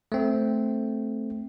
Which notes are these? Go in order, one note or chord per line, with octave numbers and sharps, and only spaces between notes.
A3 C4